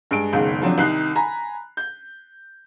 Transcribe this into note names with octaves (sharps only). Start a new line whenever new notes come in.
G2 G#3 D7
F#1 C#2 B2 D#3
F3 F#3 C4 D4
C2 D#3 D#4 F#6 C7
G#5 A#5 B5
G6